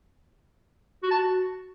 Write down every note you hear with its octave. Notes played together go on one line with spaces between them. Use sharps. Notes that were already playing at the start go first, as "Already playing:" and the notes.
F#4
A5
F#4